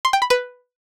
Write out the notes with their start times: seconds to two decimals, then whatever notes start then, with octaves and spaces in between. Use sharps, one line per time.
0.05 C6
0.13 G5
0.22 B5
0.30 B4